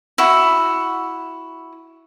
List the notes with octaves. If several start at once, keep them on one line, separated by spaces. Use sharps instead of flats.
E4 F#4